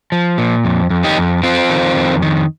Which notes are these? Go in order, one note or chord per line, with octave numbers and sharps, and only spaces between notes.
F3
A#2
F2
F2
D#4 G4
F2
F2 C4 F4
D#3
F2
D#3